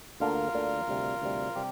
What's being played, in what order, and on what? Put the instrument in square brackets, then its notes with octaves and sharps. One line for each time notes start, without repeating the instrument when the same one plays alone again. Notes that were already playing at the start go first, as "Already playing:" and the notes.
[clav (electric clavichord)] D2 D3 A#3 D4 [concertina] F4 A#4
[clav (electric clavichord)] D2 D3 A#3 D4
D2 C3 G3
D2 C3 G3
[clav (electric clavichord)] C3 G3 [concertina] G4